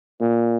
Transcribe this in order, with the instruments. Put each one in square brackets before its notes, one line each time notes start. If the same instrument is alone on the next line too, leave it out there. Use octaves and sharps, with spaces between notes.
[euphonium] A#2